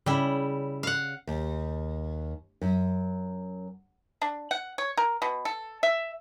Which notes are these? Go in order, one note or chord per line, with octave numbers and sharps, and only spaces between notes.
C#3 G3 C#4 E4
F5 F#5
D#2
F#2
D4
F#5
C#5
A#4
B2
A4
E5